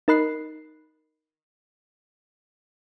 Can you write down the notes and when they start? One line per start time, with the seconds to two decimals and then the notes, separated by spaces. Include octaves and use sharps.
0.08 D#4 A#4 D#5 B5 F#6 C7